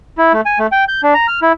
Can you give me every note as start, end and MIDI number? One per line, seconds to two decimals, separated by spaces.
0.18 0.33 64
0.34 0.41 57
0.46 0.59 80
0.59 0.67 57
0.72 0.84 79
0.88 1.01 91
1.03 1.14 62
1.14 1.27 82
1.28 1.40 89
1.42 1.52 64